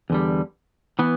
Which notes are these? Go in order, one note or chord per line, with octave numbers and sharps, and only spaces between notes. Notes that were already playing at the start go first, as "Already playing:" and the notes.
E2 D3 G3
E3 B3